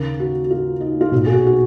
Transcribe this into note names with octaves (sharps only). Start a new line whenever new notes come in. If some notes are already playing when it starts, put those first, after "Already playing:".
Already playing: D#2 C#3 A#4
F#4
F#4
F4
D#4
F4
B1 A#2 F#4
G#4
F#4
F#4